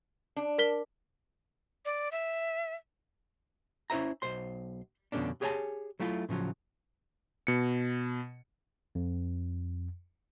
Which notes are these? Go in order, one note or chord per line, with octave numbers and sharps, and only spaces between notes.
D4
A#4 B6 G7
D5
E5
C#4 E4 C5 E5 A#5
B1 C5 C6
F2 B2 D3 C#4 D4
G4 G#4 C#5 E5 G#5 A5
F#3 A3 E4 F4
A2 C#3 F3 F#3
B2 C#7
F2